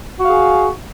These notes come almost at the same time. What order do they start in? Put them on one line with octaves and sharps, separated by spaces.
F#4 F5 G#4 G#5